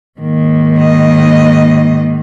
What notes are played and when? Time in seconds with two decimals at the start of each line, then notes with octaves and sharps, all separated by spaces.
0.20 G#2 D#3 A#3
0.78 D#5